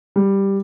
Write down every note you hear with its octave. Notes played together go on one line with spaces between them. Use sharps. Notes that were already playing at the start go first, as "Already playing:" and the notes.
G3